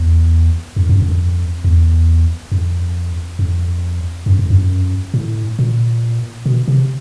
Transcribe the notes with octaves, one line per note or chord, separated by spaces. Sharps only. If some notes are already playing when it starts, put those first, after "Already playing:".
Already playing: E2
F2
F#2
F2
E2
F2
F2
F#2
F2
F#2
A2
A#2
B2
C3